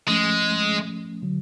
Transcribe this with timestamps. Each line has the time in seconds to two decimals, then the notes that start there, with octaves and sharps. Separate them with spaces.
0.08 F3 G#3 A3 C#4
1.22 D3 F#3